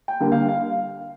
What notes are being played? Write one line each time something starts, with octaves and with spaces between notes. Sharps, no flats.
G5
D3 G3 A#3
F5
F5